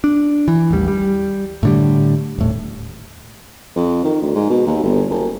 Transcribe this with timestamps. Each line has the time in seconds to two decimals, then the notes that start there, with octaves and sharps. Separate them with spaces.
0.04 D4
0.48 E3
0.71 A1 D#2 G3
0.88 G3
1.63 A2 D3 G3
2.38 D#1 A2
3.76 F2
4.04 D#3
4.22 D2
4.35 G#2
4.50 B2
4.67 D#2
4.84 G1
5.10 F#1